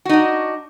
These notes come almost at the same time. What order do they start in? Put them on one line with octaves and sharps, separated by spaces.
F#4 D#4 D4